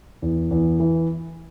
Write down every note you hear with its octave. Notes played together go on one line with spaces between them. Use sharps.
E2
E2
E3